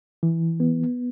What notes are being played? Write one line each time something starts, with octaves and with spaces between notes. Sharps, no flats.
E3
B3